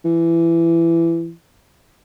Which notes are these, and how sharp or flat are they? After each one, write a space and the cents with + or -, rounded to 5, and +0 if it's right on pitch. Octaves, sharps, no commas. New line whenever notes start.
E3 +20